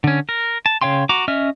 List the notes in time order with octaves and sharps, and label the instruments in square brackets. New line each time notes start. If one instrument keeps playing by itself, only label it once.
[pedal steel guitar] D3 C#4
A#4
A5
C#3 C#5 F5 G5 C6
F#4 A#5 D6
C#4 D#5 E5 F6